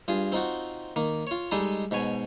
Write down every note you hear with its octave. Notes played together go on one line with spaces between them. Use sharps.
G2 F4 G#4
C4 D#4 F4 F#4
D#3 A#3
F4 C#5
G3 G#3 D#4 G#4 A4
G#2 B2 C#5 G#5